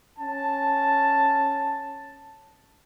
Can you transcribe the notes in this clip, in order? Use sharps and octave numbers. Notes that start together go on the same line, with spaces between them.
C#4 A5